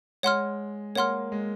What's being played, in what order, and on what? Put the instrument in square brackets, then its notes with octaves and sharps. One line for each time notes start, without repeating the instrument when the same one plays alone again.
[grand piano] G#3 [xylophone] C#5 F#5 C6 F6
[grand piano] A#3 [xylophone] C#5 F#5 C6 F6
[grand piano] G#3